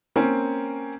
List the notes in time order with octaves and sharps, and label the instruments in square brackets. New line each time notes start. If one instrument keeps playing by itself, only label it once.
[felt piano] A#3 C4 C#4